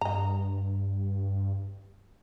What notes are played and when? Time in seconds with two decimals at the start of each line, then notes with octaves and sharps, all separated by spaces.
0.01 G2 D#5 A#5